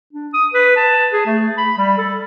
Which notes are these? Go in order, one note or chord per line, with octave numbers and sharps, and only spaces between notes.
D4
D#6
B4
A5
G#4
A3
B5
G3
A4